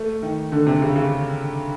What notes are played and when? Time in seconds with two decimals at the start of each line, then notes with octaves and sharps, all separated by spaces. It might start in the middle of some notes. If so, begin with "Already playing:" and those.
Already playing: A3
0.22 D#3
0.52 D3
0.67 C3
0.82 C#3
0.95 C#3